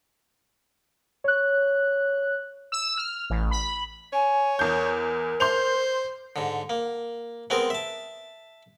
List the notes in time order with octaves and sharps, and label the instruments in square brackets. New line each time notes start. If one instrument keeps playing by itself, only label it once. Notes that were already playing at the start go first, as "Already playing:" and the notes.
[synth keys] C#5 F#6
[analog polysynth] E6
F6
A1
B5
[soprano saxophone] C#5 [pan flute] G#5
[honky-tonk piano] E2 G6 [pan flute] A#4
[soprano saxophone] C5 [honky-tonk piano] C6 G6 F7
[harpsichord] G#2 D3
A#3
G#3 B3 C4 A#4
E5 A5